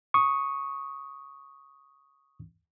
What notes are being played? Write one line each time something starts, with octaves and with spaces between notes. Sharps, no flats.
C#6 D#6